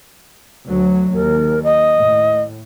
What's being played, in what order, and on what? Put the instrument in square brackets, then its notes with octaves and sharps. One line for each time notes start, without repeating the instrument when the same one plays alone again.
[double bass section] D2 F#3
[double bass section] D#2 [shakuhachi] A#4
[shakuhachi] D#5
[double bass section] A2